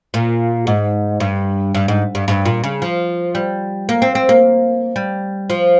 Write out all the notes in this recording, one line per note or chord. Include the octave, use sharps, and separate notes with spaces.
A#2
G#2
G2
G2
G#2
G2
G2
A#2
C#3
F3
G3
A#3
C4
C4
A#3
G3
F3